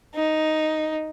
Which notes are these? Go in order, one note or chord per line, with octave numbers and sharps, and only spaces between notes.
D#4